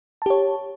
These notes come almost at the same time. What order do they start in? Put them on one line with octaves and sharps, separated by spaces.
A5 G4 C#5